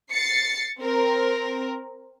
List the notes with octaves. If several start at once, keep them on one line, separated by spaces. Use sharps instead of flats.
A6 C7 C#7
C4 A#4